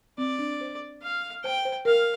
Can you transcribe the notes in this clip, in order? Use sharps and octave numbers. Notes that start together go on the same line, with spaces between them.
C4 D5
D4
C5
F5
C5 G5
C5
A#4 F5